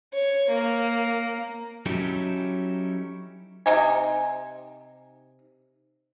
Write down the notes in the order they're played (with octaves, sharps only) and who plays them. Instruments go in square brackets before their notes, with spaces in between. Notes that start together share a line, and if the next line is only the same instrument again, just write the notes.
[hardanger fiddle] C#5
A#3
[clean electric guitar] F#3 C#4 D#4 E4 G4 A4
[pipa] C3 D#4 G#5